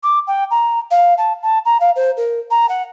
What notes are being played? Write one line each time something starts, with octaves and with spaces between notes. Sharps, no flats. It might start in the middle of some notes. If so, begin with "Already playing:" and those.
D6
G5
A#5
F5
A5
A5
A#5
F5
C5
A#4
A#5
F#5